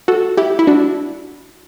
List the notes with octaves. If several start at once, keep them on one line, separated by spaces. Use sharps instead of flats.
F#4 A4
E4 G4
E4
D4 F#4